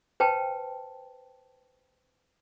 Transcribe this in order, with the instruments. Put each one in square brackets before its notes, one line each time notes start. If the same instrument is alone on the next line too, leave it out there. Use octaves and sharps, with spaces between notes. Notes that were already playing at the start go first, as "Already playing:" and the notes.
[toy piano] B4 C5 G5 A5